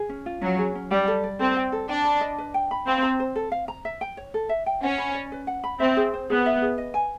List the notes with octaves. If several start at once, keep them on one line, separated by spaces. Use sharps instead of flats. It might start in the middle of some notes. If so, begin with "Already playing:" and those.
Already playing: G#4
C#4
F4
F#3 C#4
G#4
C#4
G3 G5
A4
D5
C4 A4
G5
A4
D4 G5
B5
D#5
B4
G5
B5
C4 F5
A#5
C5
A4
F5
A#5
E5
G5
C#5
A4
E5
G5
C#4 F#5
B5
D5
B4
F#5
B5
C4 E5
G#4
C5
B3 G#4
E5
G#4
D#5
G#5